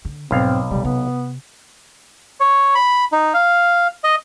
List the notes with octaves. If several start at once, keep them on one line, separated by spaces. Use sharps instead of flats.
D3
B1 G#2 F3 C4 F5
C3 E3 G3
C3 B3
C#5
B5
D#4
F5
D#5